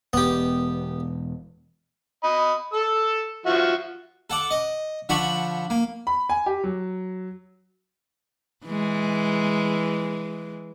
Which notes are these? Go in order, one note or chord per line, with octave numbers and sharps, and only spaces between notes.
E1 B3 G4
D#5 B5
A4 E6
F3 F#4 E5
A4 F#5 D6
D#5
D3 F3 D4 F#5 B5 C#6
A#3
B5
G#5
G4
F#3
E3 G#3